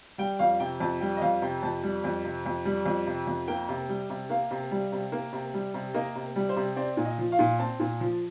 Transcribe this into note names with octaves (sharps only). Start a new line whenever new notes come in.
G3 G5
F2 F5
C3 G5
F2 A5
G3 G5
D#5
F2 F5
C3 G5
F2 A5
G3
F2
C3
F2
G3
F2
C3
F2
A#3 G5
C3
G3
C3
A#3 F5
C3
G3
C3
A#3
C3
G3
C3
A#3 D#5
C3
G3
C5
C3
C4 D5
A#2
D#5
F3
F5
A#2
C4 A5
A#2
F3